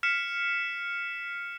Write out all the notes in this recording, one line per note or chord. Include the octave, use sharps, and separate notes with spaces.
F6 B6 C#7 E7